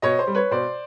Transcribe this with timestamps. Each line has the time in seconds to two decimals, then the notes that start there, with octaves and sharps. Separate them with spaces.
0.02 B2 C#5 D#5
0.19 C5
0.27 G3
0.35 B4 C#5
0.51 B2 C5 D5